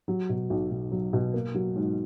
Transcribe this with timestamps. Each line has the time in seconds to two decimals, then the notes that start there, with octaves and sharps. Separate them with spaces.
0.08 F#3
0.29 B2
0.50 B1
0.71 B1
0.92 F#3
1.13 B2
1.34 A#3
1.55 F#3
1.76 G#2